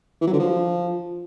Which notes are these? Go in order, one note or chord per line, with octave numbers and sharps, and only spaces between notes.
E3
F#3
D3
F3